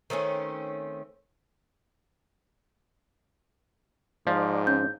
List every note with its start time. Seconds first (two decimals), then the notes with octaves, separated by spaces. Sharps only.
0.10 D#3 A3 C4 C#4
4.27 G#2 F3 D5
4.67 C#4 G6